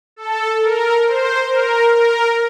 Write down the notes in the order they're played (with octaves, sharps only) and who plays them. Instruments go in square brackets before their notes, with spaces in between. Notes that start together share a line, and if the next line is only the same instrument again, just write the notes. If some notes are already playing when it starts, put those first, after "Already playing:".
[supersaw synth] A4
A#4
C5
A#4
A#4